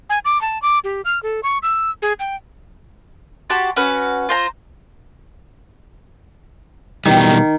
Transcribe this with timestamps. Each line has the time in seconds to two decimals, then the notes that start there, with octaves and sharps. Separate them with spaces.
0.10 G#5
0.25 D6
0.41 A5
0.62 D6
0.84 G4
1.05 F6
1.23 A4
1.43 C#6
1.63 E6
2.02 G#4
2.20 G5
3.50 F#4 G4 A5 C6
3.76 C#4 F#4 B4
4.29 F4 C5 A#5
7.06 B2 D#3 E3 G3